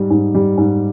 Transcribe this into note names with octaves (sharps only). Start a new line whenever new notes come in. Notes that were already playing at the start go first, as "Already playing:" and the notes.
Already playing: G#2 G3
G#2
G3
G#2